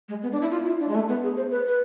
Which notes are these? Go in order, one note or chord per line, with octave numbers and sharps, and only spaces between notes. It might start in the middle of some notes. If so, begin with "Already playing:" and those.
G#3
B3
D4
E4
F4
E4
D4
G#3
A3
B3
G#4
C5
B4
B4